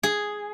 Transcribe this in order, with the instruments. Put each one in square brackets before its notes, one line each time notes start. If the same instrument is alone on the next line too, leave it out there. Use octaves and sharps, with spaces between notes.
[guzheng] G#4